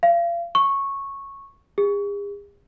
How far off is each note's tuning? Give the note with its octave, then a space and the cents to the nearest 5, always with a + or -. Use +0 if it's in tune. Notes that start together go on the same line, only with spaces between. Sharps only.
F5 -35
C#6 -10
G#4 -45